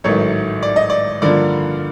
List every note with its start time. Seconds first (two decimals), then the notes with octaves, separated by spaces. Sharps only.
0.04 A1 G#2 D#3 F#3 A3 C#5
0.63 D5
0.76 D#5
0.90 D5
1.22 G2 D3 F3 A#3 D5